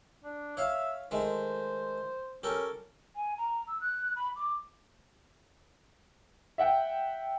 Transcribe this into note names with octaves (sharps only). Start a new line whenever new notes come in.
D4
C#5 E5 F5
D#3 G#3 A3 C5
C#4 G4 A4 A#4
G#5
A#5
E6
F#6
B5
D6
E5 F#5 G5